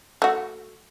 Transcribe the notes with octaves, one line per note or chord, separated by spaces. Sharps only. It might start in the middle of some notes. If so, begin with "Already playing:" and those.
A3 F#4